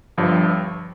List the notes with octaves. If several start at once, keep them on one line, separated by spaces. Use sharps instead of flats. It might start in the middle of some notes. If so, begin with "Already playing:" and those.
G1 G2 F3